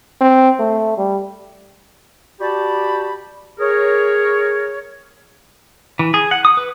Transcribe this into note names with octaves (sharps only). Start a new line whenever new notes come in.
C4
A3
G3
F#4 G4 D5 G5 A5 B5
G#4 A#4 C#5
E3
G#4
F#5
D#6
B4